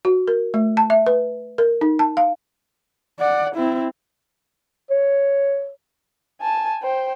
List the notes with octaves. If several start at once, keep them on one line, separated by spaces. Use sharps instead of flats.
F#4
A#4
A3
A5
E5
B4
A#4
D#4
A5
F5
D5 F#5
C4 E4
C#5
G#5 A5
C5 G5